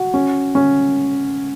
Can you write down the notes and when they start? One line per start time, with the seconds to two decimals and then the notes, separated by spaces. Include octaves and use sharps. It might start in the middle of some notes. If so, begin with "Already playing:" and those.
Already playing: F#4
0.14 C#4
0.55 C#4